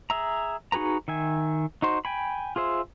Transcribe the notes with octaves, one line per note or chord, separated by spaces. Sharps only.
G#4 E5 A#5
D#4 F#4 G#4 B4 A#5
D#3 E5 G#5
D#4 F#4 C5
G5 G#5 B5
F4 G#4 C5 E5